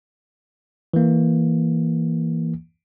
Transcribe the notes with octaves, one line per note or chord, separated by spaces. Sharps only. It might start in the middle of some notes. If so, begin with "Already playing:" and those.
E3 A#3